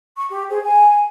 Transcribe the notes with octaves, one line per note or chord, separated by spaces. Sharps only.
C#6
G4
G#4 C5
G#5